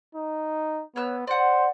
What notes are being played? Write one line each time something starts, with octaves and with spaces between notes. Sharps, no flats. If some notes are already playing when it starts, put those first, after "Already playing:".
D#4
B3 C#5 E6 F#6
C5 D5 F#5